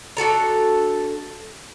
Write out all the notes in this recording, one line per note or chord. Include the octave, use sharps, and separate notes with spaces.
D4 F#4 A4 A#5